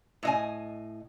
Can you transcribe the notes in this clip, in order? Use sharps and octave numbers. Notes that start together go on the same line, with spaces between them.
A2 D#5 G#5